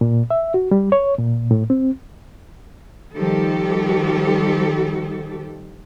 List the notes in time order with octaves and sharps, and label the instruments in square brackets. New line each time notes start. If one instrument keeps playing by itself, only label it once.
[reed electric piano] A#2
E5
F#4
G3
C#5
A#2
A2
C4
[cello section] D#3 F3 G3 G4 A4